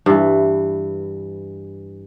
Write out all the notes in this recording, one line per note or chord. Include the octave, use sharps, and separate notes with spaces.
G2 E3